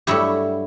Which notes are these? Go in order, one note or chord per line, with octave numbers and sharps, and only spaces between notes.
G2 F#3 A3 E4 G4